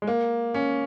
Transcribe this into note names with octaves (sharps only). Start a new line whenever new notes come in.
G#3
A#3
C#4